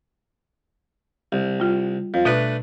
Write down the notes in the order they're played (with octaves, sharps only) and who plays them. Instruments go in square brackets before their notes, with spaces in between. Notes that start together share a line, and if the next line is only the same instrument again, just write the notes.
[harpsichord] C2
[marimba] G3 F4
[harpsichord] F2
[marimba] B2 [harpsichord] A3 D4 B4